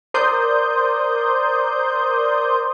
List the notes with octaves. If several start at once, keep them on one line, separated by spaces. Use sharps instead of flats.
A#4 C5 D5 C6 D#6 G6